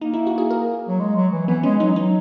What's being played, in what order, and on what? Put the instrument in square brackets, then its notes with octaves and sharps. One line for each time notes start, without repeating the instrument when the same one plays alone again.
[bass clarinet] A#3 [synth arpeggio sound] D#4
[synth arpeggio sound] E4
F#4
G#4
A#4
[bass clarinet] F#3
G#3
F#3
E3
[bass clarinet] E3 [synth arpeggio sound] B3
[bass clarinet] G#3 [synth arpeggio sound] C#4
[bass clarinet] F#3 [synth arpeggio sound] D#4
[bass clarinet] F#3 [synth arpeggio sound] D#4